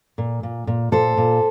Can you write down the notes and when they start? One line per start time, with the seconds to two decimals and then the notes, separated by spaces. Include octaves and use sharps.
0.18 A#2
0.43 A#2
0.67 A#2
0.92 A#2 A4 C5
1.17 A#2